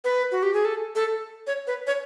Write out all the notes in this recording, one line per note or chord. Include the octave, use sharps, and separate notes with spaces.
B4
F#4
G4
G#4
A4
A4
C#5
B4
C#5